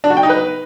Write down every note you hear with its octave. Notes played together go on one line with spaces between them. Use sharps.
D4
F#4
G5
D#4
B4